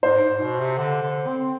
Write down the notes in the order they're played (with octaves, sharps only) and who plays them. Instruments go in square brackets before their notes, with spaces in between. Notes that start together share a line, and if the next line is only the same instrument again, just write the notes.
[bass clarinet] G#2 [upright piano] C5
[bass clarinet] G#2
B2
C3
D3
D3
C4